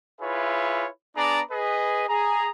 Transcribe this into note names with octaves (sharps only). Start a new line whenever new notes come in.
E4 F4 G#4 B4 C#5 E5
B3 D4 G#4 D5 A#5
G#4 B4 D#5
G#4 A#5